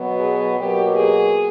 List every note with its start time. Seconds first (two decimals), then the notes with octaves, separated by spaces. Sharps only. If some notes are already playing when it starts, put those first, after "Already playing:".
Already playing: B2 F#3 B3
0.19 G#4
0.58 B2 F#3 A#3 G4
0.96 G#4